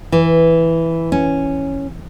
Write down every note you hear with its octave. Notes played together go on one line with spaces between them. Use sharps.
E3
C#4